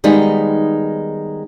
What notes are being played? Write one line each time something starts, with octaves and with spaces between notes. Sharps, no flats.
D#3 G3 G#3 B3 D#4